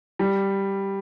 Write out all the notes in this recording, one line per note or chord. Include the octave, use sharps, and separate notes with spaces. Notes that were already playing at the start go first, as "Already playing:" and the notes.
G3